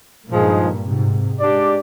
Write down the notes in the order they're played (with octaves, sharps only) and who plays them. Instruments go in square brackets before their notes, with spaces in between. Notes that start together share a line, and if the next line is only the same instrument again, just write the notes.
[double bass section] G2 A#2 [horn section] F3 G#3 D#4 G#4
[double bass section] G#2 C3
[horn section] G#3 D4 G4 D5